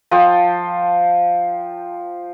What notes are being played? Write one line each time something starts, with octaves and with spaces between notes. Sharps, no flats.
F3 C5 G5